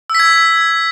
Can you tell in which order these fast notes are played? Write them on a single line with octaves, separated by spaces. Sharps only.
E6 B6 G#6